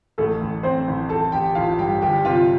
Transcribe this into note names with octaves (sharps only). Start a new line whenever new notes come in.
A1 A3 A4
A1
A1 C4 C5
A1
A1 A4 A5
A1 G4 G5
A1 F4 F5
G2 G4 G5
G1 G4 G5
C3 F4 F5